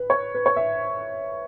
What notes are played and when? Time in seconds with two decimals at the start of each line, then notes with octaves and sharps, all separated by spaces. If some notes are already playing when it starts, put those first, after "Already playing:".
Already playing: B4
0.10 C#5
0.35 B4
0.46 C#5
0.56 E5